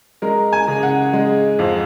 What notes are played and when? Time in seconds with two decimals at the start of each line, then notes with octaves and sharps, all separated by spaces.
0.22 G#3 A#4
0.53 G#5
0.68 C#3
0.83 F#5
1.13 G#3
1.59 F2